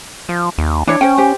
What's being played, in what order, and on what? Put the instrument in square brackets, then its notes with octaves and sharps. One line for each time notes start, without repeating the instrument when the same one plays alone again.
[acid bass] F3
D#2
[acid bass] E3 [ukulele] D4 C#5
[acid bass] C#4 [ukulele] C5 G5
[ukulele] G4 C5